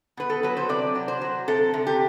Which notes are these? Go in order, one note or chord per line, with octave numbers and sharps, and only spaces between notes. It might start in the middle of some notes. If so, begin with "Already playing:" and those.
B2 B4
A4
F#3 B4
C5
C3 D5
F#3
C5
F#3
C3 A4
C3
G4